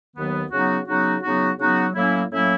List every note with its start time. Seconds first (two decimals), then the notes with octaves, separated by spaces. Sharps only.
0.16 D#2 D#3 F#3 B3
0.51 C#3 F#3 B3 D#4 F#4
0.87 C#3 F#3 B3 D#4 F#4
1.22 C#3 F#3 B3 D#4 F#4
1.58 C#3 F#3 B3 D#4 F#4
1.94 A2 F#3 A#3 C#4 E4
2.30 A2 F#3 A#3 C#4 E4